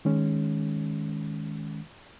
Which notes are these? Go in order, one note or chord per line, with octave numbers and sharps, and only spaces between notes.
D#3 G#3 C#4